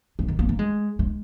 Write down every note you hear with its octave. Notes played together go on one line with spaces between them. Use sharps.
G#3
D#3
A#3
A#3
G#3
G#3